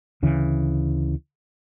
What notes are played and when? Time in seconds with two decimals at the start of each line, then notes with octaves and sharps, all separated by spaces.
0.22 D2 C#3 E3